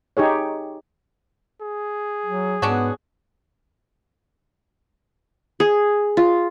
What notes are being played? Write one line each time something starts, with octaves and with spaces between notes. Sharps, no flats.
D#4 G4 G#4 C#5
G#4
F#3
G#2 B3 C#4 D4 F#4
G#4
F4